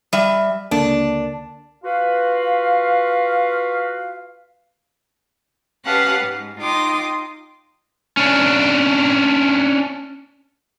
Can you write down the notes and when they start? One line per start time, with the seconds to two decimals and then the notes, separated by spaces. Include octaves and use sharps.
0.13 G3 E5
0.71 C#2 D3 A#3 D4
1.84 F4 F#4 B4 F5
5.85 C#4 G4 B4 F5 F#5 A5
6.20 G#2 G#3
6.61 D#4 F4 G5 C6 D6 D#6
8.17 C#4 D4